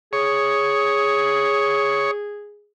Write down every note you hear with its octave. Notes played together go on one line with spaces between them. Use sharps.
G#4 C#5 D#6